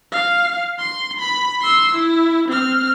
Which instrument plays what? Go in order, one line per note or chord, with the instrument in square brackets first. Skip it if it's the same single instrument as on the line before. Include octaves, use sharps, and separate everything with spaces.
[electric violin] F5
C6
B5
C6 E6
E4
C4 F6